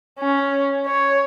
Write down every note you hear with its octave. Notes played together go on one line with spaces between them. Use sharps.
C#4
C#5